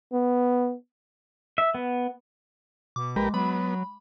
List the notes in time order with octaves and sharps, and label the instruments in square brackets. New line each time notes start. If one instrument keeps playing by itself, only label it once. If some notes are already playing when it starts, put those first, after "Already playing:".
[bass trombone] B3
[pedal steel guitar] E5
B3
[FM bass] B2 [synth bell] D6
[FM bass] A#1 [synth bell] G#3 [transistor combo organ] G4 A#4 B4
[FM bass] F#3 [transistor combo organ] B3 [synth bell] B5